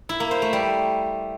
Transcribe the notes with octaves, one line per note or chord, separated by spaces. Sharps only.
E4
A#3
C5
A3
G3